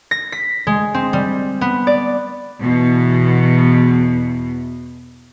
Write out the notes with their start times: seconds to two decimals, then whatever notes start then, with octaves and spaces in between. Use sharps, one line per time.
0.11 A#6
0.32 B6
0.67 G#3
0.94 C4
1.13 G3
1.61 B3
1.87 D5
2.63 E2 B2